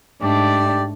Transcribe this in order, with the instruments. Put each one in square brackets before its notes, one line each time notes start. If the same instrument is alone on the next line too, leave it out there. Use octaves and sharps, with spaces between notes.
[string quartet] G#2 A3 D4 [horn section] G4 D5